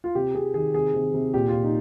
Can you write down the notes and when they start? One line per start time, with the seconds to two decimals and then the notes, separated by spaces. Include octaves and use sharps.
0.04 F4
0.15 C3 G4
0.34 C3 G#4
0.54 D#3 G#4
0.74 C3 G#4
0.94 C3
1.14 C3
1.34 A#2 G4
1.48 A#2 F4
1.64 D#4